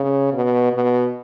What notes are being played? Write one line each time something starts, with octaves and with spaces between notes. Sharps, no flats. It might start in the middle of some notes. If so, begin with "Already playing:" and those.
Already playing: C#3
B2
B2